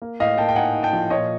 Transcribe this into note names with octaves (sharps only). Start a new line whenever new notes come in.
A#3
A2 D#5 F5
A#3 G5 A5
G5
D#4 F#5 G#5
D#4
G5 A5
F3
A#2 C#5 D#5